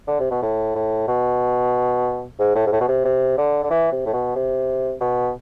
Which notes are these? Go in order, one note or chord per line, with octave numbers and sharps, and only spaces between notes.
D3
C3
B2
A2
A2
B2
G#2
A2
G#2
A2
B2
C3
C3
D3
D3
E3
C3
A2
B2
C3
B2